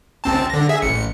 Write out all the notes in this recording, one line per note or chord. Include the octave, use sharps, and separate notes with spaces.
C#2 C4 A5
D3 A#6
G#4 E5
A1 C#7